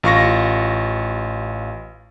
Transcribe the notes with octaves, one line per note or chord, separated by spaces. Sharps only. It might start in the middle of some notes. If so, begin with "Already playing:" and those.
A1 F4 C#6 A#6